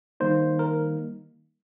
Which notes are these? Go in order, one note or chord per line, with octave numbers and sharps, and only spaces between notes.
D#3 G3 A#3 D#4 C5
A#4